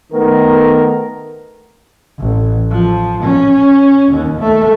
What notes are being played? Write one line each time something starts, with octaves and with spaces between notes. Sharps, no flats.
D#3 A3 B3 A#4
A1
F3
C#4
D#2
A3